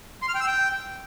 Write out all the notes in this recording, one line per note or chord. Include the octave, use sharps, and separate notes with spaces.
C6
F6
G5
E6
G5